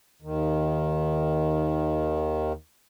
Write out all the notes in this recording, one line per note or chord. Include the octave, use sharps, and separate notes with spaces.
D#2 D#3